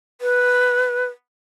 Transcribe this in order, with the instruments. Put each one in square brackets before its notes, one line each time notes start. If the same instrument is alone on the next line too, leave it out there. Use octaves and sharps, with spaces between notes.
[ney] B4